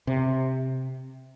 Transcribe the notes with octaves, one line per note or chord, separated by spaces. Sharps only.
C3